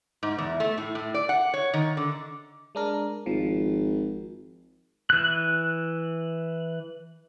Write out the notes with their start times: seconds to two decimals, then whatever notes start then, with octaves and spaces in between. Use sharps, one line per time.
0.23 G#2
0.38 E2
0.60 A3
0.78 A2
0.95 A2
1.14 D5
1.29 F#5
1.54 C#5
1.74 D#3
1.97 D3
2.75 G#3 D4 A#4
3.26 G#1 F3
5.10 E3 F#6